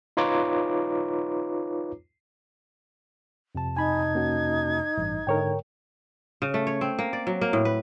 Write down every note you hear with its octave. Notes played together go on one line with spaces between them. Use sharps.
D#4 F4 B4 C#5 A#5 D6
F2 C3 A5
D#4 G#5 B5 G#6
A#3 C#4 F#4
A1 G2
G#2 D3 A#4 C#5 G5
C#3
A3
C#5
C4
A#3
D5
F#3
A#3
A2
B4